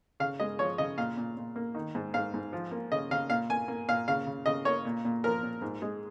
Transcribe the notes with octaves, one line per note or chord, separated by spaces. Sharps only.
C#3 F5
G#3 D#5
F3 C#5
C#3 D#5
A#2 F5
A#2
A#2
A#3
D#3
G#2
G#2 F5
G#2
F3
A#3
C#3 D#5
C#3 F5
A#2 F5
A#3 G#5
A#3
A#2 F5
C#3 F5
C#3
C#3 D#5
A#3 C#5
A#2
A#2
F3 A#4
A#2
G#2
G#3